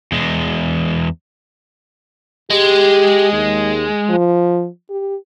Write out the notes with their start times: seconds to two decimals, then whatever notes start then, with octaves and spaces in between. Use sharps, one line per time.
0.12 E2 G#3
2.50 G#3 G4
3.33 D#2
4.09 F3
4.90 G4